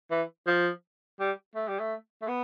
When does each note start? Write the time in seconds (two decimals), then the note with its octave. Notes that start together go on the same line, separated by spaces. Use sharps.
0.11 E3
0.47 F3
1.20 G3
1.55 A3
1.68 G3
1.79 A3
2.22 A3
2.28 B3